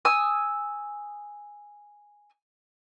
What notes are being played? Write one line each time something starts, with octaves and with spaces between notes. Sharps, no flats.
G#5 D#6 E6